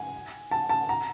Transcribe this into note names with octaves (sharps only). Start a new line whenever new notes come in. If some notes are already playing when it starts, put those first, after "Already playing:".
Already playing: G#5
A5
A5
A#5